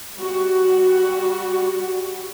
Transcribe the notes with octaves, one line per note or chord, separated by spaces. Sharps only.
G3 F#4